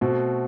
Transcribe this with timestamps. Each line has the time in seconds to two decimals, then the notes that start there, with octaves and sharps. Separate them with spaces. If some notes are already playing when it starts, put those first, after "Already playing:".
0.01 B2 A3 C4 F#4